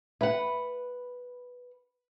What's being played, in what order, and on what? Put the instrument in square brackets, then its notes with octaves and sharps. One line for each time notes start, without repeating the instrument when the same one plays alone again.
[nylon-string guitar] B4 F#5 [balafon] E5